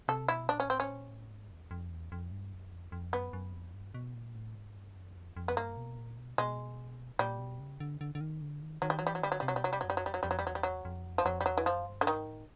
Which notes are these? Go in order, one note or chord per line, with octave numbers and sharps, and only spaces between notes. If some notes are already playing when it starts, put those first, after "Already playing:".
C3 A4
B2 E4
A#2 D4
C#4
A2 C4
C#4
A#2
A2
G#2
E2
F2
E2
F2
G2
F#2
F2
F2
F#2 B3
F#2
F2
G2
B2
A#2
A2
G#2
G2
F#2
F2
F2
B3
G2 A#3
B2
A#2
B2
B2 G#3
A#2 G3
B2
C#3
D3
D3
D3
D#3
D3
D#3
D#3 F#3
G3
F#3
E3 G3
F#3
D3 G3
F#3
C3 G3
F#3
B2 G3
C3 F#3
G3
F#2 F#3
G3
F#3
F2 G3
F#3
F2 G3
F#3
G3
E2 F#3
G3
F#3
F2
F3
F2 F#3
G3
E2 F#3
E3
F#2 F3
G2
D3
G#2 D#3
A2